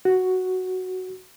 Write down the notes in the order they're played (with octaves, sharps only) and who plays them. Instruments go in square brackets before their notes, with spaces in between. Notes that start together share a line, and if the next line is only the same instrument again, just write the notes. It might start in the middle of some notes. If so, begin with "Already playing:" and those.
[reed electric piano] F#4